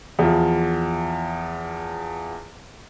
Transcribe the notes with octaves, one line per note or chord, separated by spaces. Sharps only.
E2 F3